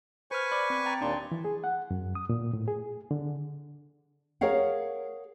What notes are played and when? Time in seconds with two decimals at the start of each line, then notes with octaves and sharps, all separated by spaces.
0.31 B4 C5 G#5 C#6 F6
0.52 D5 B5 D6
0.70 C4
0.86 G5 A#5 A6
1.01 D#2 A#2 D4 D5 C6
1.32 E3
1.45 G#4
1.64 F#5
1.91 F#2
2.15 D#6
2.29 A#2
2.53 A2
2.68 G#4
3.11 D3
4.41 G#4 A#4 C#5 F5 F#5